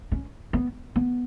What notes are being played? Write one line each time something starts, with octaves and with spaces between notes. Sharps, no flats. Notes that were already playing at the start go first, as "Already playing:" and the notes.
C#4
B3
B3